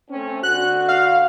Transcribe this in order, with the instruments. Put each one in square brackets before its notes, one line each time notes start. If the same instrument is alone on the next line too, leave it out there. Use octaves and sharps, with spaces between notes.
[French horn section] A3 C4 C#4
[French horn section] D3 F#4 [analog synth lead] F#6
[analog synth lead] F5